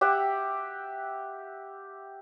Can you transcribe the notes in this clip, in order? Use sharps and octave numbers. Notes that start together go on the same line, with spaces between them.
G4 E5 F#5 G5